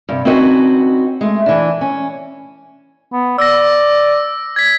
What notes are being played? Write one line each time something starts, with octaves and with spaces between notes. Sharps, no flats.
G2 C3
C4 C#4 D#4 F#4 B4 D#5
G#3 A3
E3 D4
C#4
B3
D5 E6 A#6
G#6 B6